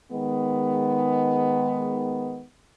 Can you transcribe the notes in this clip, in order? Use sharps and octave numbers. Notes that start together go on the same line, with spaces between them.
D#3 G#3 B3